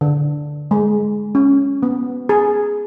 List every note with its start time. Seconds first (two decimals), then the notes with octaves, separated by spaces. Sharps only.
0.01 D3
0.71 G#3
1.35 C#4
1.83 B3
2.29 G#4